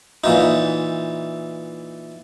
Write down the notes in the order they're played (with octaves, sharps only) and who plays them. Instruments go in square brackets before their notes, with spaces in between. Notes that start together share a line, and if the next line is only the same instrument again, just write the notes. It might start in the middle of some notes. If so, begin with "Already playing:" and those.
[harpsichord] A#2 E3 D#4